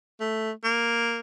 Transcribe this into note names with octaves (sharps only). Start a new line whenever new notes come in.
A3
A#3